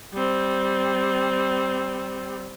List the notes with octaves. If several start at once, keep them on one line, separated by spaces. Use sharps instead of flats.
G3 C4